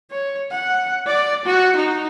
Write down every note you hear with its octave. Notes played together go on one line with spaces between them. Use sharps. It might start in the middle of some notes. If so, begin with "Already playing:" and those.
C#5
F#5
D5
F#4
D#4